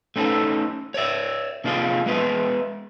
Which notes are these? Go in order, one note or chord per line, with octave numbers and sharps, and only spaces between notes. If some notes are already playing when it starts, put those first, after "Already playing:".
A3 C#4 D#4 G#4 A4
C#5 D5 E5
C3 A#3 D4 F4 G#4 D#5
G#3 B3 D#5 E5